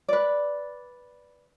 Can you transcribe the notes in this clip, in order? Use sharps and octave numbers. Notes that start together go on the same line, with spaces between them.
B4 D5